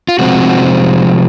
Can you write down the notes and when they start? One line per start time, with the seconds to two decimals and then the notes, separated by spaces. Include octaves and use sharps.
0.09 F4
0.19 C3 F3 G#3 C4 F#4